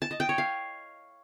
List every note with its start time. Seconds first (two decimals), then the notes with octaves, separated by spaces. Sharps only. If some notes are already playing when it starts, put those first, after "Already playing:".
0.02 A5
0.11 D#5
0.20 G5
0.29 C#5
0.38 F5